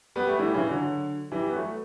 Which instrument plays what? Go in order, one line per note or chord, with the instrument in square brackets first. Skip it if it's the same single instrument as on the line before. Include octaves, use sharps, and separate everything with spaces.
[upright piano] G3 B3
A3
E3 G3
C#3 E3
D3 F#3
E3 G3
B3
F#3 A3